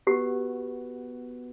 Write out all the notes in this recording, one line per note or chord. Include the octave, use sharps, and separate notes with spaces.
B3 F#4 G4 B4